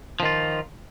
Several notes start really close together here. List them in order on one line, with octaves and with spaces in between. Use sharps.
F3 D#3 F4